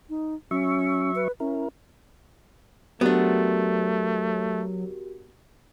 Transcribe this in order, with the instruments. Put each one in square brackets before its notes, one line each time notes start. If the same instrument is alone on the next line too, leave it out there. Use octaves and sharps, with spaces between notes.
[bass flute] D#4
[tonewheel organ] F#3 E5 C#6 [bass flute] C#4
[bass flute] B4
[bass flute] C#4 [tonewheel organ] E4 A#4
[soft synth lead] F#3 [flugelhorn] A3 [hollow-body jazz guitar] B3 D4 [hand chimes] F#4 G4 A#4